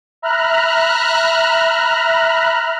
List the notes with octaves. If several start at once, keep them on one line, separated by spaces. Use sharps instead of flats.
E5 A#5 B5 F6 F#6